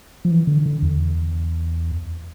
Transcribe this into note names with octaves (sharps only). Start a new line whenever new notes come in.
F3
E3
D3
D3
E2